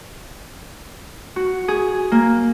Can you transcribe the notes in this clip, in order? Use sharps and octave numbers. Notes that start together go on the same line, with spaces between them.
F#4
G#4
A#3